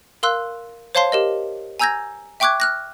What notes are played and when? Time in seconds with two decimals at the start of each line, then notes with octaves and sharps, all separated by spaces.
0.23 A#4 F5 C6 E6 F#6
0.95 C5 C#5 F5 A5 C6 C7
1.12 G4 A#4 D#5
1.80 G#5 A#5 E6 G6 G#6 A#6
2.40 E5 G5 C#6 D6 F#6 G#6
2.60 F6 F#6 A#6